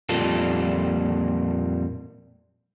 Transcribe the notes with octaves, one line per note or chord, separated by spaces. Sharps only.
F2 A#2 G3 A#3 F4 A4